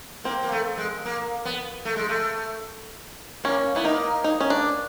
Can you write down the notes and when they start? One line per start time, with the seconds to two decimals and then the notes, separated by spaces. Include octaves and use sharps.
0.24 A#3 C4
0.43 A#3
0.52 A3
0.78 G#3
1.05 A#3
1.45 B3
1.85 A3
1.96 G#3
2.09 A3
3.44 A#3 C#4
3.75 B3 E4
3.84 A#3 D#4
4.24 D#4
4.41 C#4
4.50 D4